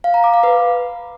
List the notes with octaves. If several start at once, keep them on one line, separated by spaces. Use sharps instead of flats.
F5
A#5
D6
F5
B4